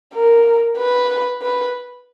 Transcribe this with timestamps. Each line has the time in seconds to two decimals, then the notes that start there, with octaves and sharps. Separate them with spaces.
0.14 A#4
0.77 B4
1.42 B4